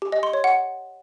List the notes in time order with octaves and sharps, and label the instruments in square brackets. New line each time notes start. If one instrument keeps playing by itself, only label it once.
[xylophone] G4
D#5
C6
C#5
F#5